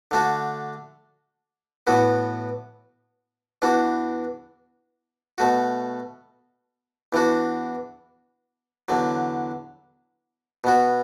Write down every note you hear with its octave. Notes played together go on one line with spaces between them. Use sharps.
D3 A3 D4 F#4
A2 E3 B3 F#4
E2 E3 D4 F#4
B2 A3 F#4
E2 E3 D4 F#4
E2 D3 F#3
B2 B3 F#4